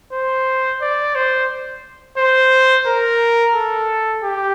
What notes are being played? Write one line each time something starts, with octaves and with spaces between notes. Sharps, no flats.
C5
D5
C5
C5
A#4
A4
G4